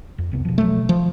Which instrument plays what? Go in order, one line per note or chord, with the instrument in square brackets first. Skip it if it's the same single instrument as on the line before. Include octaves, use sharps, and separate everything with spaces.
[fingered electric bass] F2
C2 C3 B3
B2 F3
[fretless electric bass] F#3 A3
F3